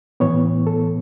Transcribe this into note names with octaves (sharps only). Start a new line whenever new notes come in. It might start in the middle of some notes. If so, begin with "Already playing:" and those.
A2 E3 B3 C#5
A4